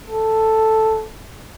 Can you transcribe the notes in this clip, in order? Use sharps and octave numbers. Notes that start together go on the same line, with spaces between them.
A4